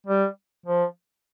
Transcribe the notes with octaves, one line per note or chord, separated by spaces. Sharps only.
G3
F3